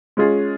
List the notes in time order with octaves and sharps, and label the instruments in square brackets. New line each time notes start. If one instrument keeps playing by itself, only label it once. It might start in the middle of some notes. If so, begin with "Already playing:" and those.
[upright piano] G#3 C#4 F4 G#4